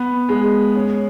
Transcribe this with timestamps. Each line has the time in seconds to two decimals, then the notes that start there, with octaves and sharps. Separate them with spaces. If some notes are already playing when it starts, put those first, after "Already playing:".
Already playing: B3
0.29 G#3
0.76 C#4